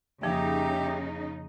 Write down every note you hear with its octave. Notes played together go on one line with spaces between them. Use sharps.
F2 C#3 F3 A#3 D#4 G4 E5